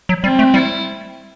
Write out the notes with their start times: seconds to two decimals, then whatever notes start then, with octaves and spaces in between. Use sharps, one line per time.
0.09 F#3
0.24 G3 C4
0.39 A3
0.54 G3 E4